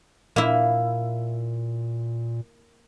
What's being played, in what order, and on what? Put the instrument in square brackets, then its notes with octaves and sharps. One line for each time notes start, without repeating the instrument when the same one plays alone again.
[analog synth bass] A#2 [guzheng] A#3 E4